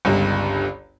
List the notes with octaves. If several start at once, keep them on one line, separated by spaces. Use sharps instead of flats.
G1 C#2 G2